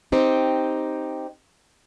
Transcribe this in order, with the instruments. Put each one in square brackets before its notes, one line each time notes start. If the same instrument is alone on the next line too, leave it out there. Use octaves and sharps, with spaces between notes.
[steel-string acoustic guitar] C4 D#4 G4